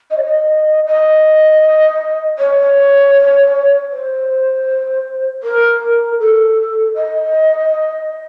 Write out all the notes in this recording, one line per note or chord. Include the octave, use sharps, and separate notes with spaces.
D#5
C#5
D#5
D#5
C#5
C5
A#4
A4
D#5